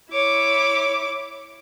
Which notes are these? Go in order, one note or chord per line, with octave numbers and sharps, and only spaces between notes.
E4 C#5 D6